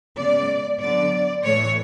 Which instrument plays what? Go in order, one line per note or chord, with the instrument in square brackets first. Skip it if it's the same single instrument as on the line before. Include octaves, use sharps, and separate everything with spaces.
[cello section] C#3 G#3 B3 D5
D3 F#3 B3 D5
A2 E3 A3 C#5